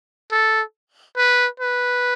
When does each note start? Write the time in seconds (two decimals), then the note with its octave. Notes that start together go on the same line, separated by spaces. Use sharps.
0.32 A4
1.17 B4
1.60 B4